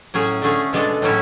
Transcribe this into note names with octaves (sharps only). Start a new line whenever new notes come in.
A2 F#3 C#4 G#4
D3 A3 C#4 G#4
B2 G#3 D4 A4
A2 F#3 C#4 E4